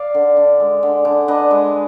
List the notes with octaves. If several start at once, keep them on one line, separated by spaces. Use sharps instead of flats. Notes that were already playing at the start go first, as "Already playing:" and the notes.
Already playing: D5 F5
D3
D4
G#3
D3
D3
D4 B4 D#5
G#3